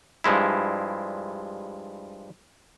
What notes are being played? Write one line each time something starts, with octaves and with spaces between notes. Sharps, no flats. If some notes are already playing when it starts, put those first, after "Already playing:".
G2 F3 G#3 E4